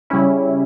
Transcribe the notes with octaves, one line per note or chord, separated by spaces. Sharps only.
C#3 G3 C#4 E4